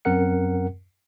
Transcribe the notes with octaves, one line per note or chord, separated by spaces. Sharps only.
F#2 C4 A#4 F#5 C#7